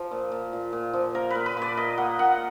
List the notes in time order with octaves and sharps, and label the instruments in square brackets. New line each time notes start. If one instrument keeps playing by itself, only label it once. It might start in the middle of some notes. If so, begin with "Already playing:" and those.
Already playing: [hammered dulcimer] F3
A#2
A#2
A#2
A#2
F3
A#3 A#4
A#2 B4
B4
A#2 D5
A#3 D#5
A#3 F#5
A#2 F#5